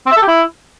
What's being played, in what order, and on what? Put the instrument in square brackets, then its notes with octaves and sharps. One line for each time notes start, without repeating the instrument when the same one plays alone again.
[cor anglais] C4
E5
A4
G4
E4